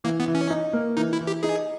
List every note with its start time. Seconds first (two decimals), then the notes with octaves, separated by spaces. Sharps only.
0.04 E3 A#3
0.20 B3
0.28 E3
0.35 C#4
0.50 D#4
0.73 A#3
0.97 E3 D#4
1.13 E4
1.21 E3
1.27 G4
1.43 D#4 G#4